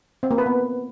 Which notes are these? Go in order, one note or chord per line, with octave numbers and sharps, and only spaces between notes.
C4
A#3
B4
B3